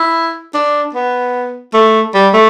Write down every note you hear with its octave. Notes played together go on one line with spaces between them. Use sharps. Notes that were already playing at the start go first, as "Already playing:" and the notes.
Already playing: E4
D4
B3
A3
G3
A3